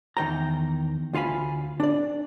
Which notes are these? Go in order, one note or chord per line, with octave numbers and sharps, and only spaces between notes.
E2 D#3 G5 A#5
D2 F4 F5 G#5 B5
D4 D5